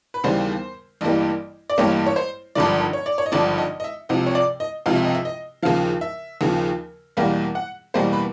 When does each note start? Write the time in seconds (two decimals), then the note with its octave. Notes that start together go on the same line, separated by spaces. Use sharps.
0.14 B4
0.24 D#2 C#3 E3 G3 B3 C5
1.01 A1 G2 E3 G3 A#3
1.70 D5
1.78 A1 G2 E3 G3 A#3 C#5
2.07 C#5
2.16 C5
2.55 G#1 G2 D3 F3 D5
2.93 C#5
3.06 D5
3.18 C#5
3.26 D#5
3.32 G#1 G2 D3 F3 D5
3.58 D#5
3.80 D#5
3.84 E5
4.09 C#2 C3 F3 D#5
4.27 C#5
4.35 D5
4.60 D#5
4.86 C#2 C3 F3 F5
4.96 E5
5.04 D#5
5.15 E5
5.25 D#5
5.63 D#2 C#3 F3 F5
6.01 E5
6.41 D#2 C#3 F3
7.17 E2 B2 G3 A#3 F5
7.55 F#5
7.94 E2 B2 G3 A#3 C5
8.13 B4